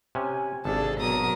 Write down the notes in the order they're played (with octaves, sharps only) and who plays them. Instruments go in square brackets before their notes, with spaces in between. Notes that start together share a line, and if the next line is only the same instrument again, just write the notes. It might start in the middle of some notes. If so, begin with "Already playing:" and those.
[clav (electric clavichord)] C3 C#4 [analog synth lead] G#5
[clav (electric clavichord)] G#1 [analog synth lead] C3 [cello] D4 G#4 [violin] A4
[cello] B2 F#3 [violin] A#4 D#6